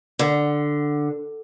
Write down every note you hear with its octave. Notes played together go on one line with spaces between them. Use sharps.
D3